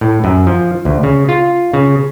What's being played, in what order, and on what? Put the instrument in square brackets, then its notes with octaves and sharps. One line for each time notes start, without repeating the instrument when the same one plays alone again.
[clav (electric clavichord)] A2
F#2
F3
D2
C#3
F4
C#3